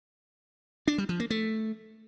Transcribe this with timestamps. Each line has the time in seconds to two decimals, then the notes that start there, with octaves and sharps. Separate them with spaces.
0.88 D4
0.98 G3
1.09 F3
1.20 A#3
1.30 A3